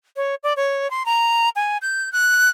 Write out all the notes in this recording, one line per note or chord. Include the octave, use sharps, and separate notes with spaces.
C#5
D5
C#5
C6
A#5
G#5
G6
F#6